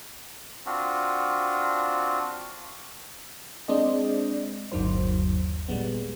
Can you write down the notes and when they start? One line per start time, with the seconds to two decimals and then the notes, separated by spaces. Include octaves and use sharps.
0.66 C4 D4 F4 F#4
3.68 G#3 C4 D4 C5 D5 D#5
4.72 G1 D#2 D#3 F#3 C5
5.69 A#2 G3 G#3 B3